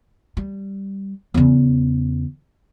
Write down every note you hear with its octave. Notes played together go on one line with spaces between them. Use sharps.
G3
E2 C#3